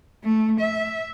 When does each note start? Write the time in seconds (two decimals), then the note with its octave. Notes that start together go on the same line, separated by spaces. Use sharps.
0.24 A3
0.60 E5